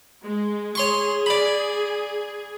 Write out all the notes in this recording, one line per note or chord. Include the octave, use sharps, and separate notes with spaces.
G#3
G#4 C#5 C6 C#6
D5 B5